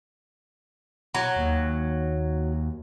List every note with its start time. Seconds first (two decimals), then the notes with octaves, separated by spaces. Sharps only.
1.15 F#3
1.37 D#2